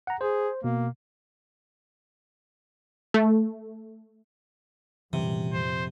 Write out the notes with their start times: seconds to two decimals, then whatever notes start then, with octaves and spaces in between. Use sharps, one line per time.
0.07 F#5 A#5
0.21 G#4 C5
0.64 B2 A#3
3.14 A3
5.13 A#1 F#2 C3 E3 F3 G3
5.53 F2 C5